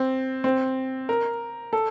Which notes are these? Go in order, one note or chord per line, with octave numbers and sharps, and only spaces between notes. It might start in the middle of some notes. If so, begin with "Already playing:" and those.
Already playing: C4
C4
A#4
A4